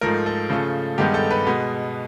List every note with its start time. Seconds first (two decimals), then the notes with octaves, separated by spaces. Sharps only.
0.01 G#2 F3 A3 A#4
0.26 A4
0.50 C#3 F3 A3
0.98 G2 D#3 G#3 B3 G4
1.14 A4
1.31 B4
1.47 B2 G#3 B3